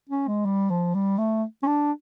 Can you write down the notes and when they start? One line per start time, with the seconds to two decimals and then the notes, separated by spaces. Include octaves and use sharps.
0.10 C#4
0.28 G#3
0.46 G3
0.70 F3
0.94 G3
1.18 A3
1.63 C#4
1.67 D4